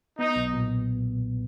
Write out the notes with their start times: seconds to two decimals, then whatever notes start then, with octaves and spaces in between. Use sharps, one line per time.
0.19 B3 D#4
0.36 B1
0.54 A#2